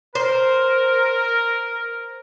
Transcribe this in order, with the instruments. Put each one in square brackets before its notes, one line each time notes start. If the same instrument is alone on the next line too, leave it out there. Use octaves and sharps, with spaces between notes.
[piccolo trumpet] A#4 [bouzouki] C5